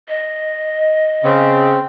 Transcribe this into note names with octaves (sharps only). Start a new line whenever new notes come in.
D#5
C#3 C4